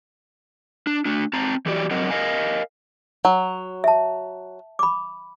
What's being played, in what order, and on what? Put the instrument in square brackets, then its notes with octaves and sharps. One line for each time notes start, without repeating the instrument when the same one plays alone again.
[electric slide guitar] D4
A3 D4
C4 A5 A#5
E3 F#3 G4 D5
G#2 F#3 C4 A#4 D#5 F#5
A#4 C5 D#5 F5 G#5
[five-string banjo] F#3
[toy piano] E5 A5
B5 D6